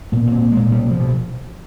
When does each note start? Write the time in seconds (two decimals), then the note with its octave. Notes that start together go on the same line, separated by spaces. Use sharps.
0.12 A#2 B3
0.27 A#2 C4
0.42 A#2
0.52 A#2 G#3
0.72 B2 G3
0.86 B2 F3
1.00 B2